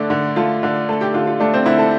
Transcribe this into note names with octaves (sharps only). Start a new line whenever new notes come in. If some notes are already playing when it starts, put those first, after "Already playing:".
Already playing: D3 A3 D4
D3
A3 F4
D3
A3 A4
G4
D3 F4
F4
A3 D4
C4
D3 E4
A4